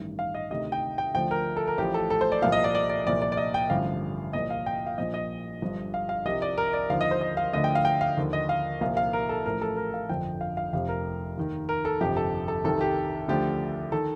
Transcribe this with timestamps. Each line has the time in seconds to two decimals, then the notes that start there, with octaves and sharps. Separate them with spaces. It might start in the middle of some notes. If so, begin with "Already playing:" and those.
Already playing: A1 G2 D#3
0.19 F5
0.34 D#5
0.51 D2 C3 D#3 D#5
0.72 G5
0.98 G5
1.14 D2 D3 F3 G5
1.31 A#4
1.57 A4
1.68 A#4
1.78 A1 A2 F3 G4
1.94 A4
2.10 A4
2.21 C5
2.32 D5
2.42 C2 A#2 F3 F5
2.52 D#5
2.64 D5
2.75 D5
2.89 D5
3.05 C2 A#2 F3 D5
3.22 D5
3.32 D5
3.37 D#5
3.54 G5
3.70 A1 G2 D3 F3 F5
4.33 C2 A#2 F3 D#5
4.50 F5
4.66 G5
4.87 F5
4.98 A#1 A#2 F3 D#5
5.14 D#5
5.62 G1 G2 F3
5.94 F5
6.09 F5
6.26 C2 C3 F3 D#5
6.42 D5
6.58 A#4
6.73 D5
6.89 D#2 D3 F3 F5
7.01 D#5
7.11 C5
7.21 D#5
7.37 F5
7.53 D2 D3 F3 D#5
7.64 G5
7.75 F5
7.85 G5
8.01 F5
8.17 D#2 D3 F3
8.33 D#5
8.49 F5
8.81 C2 A#2 F3 F5
8.97 F5
9.13 A#4
9.29 A4
9.46 A1 A2 F3 A#4
9.61 A4
9.77 A#4
9.94 F5
10.09 G1 F2 D3 F3 G5
10.41 F5
10.57 F5
10.73 F1 F2 C3 F3 F5
10.88 A#4
11.37 D#2 D#3
11.69 A#4
11.85 A4
12.00 G1 F2 C3 F3 G4
12.17 A4
12.48 A4
12.64 C2 C3 D#3 A4
12.81 G4
13.28 D2 D3 F3 G4
13.92 D#3 A4